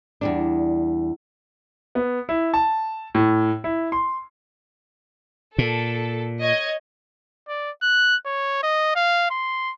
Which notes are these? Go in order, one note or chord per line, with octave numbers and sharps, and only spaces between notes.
E2 G3 D4
B3
E4
A5
A2
E4
C6
A#2 A4
C#5 D#5 G#6
D5
F#6
C#5
D#5
F5
C6